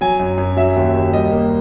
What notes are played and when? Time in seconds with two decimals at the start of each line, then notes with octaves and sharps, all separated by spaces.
0.01 F#3 G#5
0.20 F#2
0.38 F#2
0.57 F#3 E5
0.76 D#2
0.94 D#2
1.13 G3 D#5
1.32 A#3